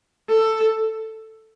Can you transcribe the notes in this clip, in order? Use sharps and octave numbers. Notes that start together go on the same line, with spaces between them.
A4